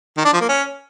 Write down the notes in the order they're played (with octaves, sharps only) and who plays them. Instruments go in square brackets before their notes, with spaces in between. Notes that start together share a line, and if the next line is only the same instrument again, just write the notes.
[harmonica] D#3
D4
F3
A#3
C#4